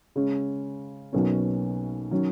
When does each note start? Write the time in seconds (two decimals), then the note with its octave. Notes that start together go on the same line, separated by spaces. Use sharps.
0.16 C#3 G#3 C#4
1.13 B1 B2 F#3 A#3 C#4
2.11 D#3 F#3 C#4